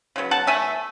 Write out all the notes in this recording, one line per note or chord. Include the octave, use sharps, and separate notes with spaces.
C#3 F#3 B3
F#5 A5
B2 A3 E5 G#5